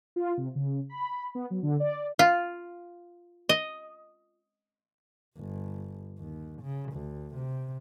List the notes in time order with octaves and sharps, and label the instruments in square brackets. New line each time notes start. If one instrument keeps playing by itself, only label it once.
[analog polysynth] F4
C3
C#3
B5
B3
F#3
D3
D5
[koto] F4
D#5
[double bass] G1
D#2
C#3
D2
C3